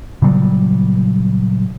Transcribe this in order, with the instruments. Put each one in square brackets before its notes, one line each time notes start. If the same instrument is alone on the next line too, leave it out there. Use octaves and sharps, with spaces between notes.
[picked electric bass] A#2 C#3 F#3 G3